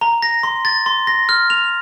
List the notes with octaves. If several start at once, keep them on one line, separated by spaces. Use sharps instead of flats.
A#5
A#6
C6
A6
C6
A#6
F6
F7